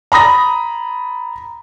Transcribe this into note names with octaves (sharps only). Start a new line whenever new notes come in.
A#5 B5 D#6 A#6